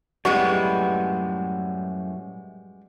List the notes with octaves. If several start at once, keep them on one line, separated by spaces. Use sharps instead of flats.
F#2 A2 G3 G#3 B3 F#4 F#5